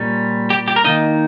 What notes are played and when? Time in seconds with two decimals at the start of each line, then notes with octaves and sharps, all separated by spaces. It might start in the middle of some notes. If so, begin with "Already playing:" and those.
Already playing: A#2 G3 C#4
0.50 G4
0.68 G4
0.76 A#4
0.84 D#3 A#3 D#4 D#5